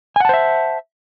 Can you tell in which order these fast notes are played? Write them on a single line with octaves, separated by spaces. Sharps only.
G#5 F#5 A5 C5 E5